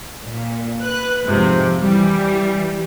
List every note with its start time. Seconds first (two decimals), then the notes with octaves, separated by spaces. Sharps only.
0.24 A#2
0.81 B4 F#6
1.25 F2 G#2 C3 F3
1.80 E3 G3